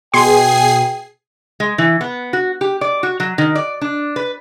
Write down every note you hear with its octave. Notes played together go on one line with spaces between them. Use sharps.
B2 G#4 G5 G#5 C6 C7
G#3
E3
B3
F#4
G4
D5
F#4
F#3
D#3
D5
D4
B4